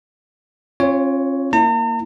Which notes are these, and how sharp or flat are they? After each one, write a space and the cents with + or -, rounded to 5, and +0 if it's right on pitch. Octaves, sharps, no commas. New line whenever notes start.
C#4 -40 F4 +0 C#5 +10
A#3 +0 E4 -25 A#5 -45